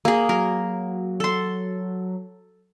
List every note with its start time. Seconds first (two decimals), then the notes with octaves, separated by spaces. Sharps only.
0.05 A#3 G#4
0.29 F#3 A#4
1.20 A4 C6